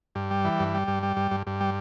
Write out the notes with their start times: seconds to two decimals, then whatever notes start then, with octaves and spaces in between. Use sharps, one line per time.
0.15 G2
0.31 G3
0.45 E3
0.60 G2
0.74 G3
0.88 G2
1.03 G3
1.17 G2
1.31 G2
1.47 G2
1.61 G3